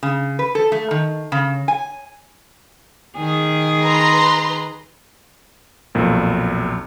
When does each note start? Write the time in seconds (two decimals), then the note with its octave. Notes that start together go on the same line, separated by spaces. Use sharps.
0.03 C#3
0.39 B4
0.55 A4
0.72 A3
0.91 D#3
1.32 C#3
1.68 G#5
3.17 D#3 G#4
3.84 B4 A#5 C6
5.95 B1 F2 A#2